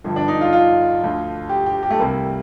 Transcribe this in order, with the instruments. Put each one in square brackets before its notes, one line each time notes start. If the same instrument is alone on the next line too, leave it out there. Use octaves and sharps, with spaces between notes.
[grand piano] G1 G2 D3 F3
D4
D#4
F4
F4
D2 D3 F3
G4
G4
G4
A3
C2 C3 G3 A#3